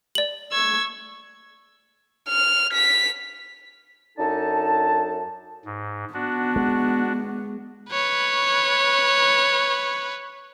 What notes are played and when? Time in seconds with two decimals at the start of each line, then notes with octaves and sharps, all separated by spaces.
0.15 D5 F#7
0.53 C#6 E6 G#6
2.29 F6
2.73 B6
4.17 F#2 D4 D#4 A4 A5
5.65 G#2
6.14 B3 D4 F#4
6.56 G#3
7.90 B4 C#5